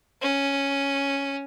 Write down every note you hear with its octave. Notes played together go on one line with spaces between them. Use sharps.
C#4